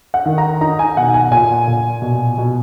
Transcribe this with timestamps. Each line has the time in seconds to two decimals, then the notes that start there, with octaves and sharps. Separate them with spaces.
0.14 F#5
0.26 D#3
0.38 A#5
0.61 D#4 A#5
0.79 G#5
0.97 B2 F#5
1.14 G#5
1.31 A#2 G#5
1.67 A#2
2.02 B2
2.38 B2